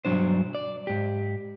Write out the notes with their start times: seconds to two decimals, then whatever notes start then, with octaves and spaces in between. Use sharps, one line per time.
0.05 B1 G2 B2 F#3 D4 C5
0.55 D5
0.87 G#2 G4